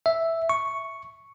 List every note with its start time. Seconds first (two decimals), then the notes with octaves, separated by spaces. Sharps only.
0.06 E5
0.49 C#6